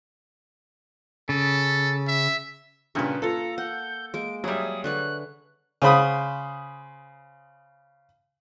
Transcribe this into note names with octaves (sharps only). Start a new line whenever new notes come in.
C#3 A4
E5
G2 A#2 C#3 A#4 B4
A#3 F4 A4 A#5
F#5 G6
G#3 A#3 D7
F#3 G3 G#4 E5 D#6
D3 B4 C#5 F#6
C#3 C5 B5 D#6